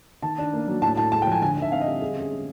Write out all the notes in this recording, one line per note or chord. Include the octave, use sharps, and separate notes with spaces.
D#3 A5
D4
A#3
F#3
A2 A5
A2 A5
G#3 A5
G5
F3 G#5
D3 G#5
D#4
E5
C4 F5
D#5
G3
D3 G#4
C#4 G#4
G#3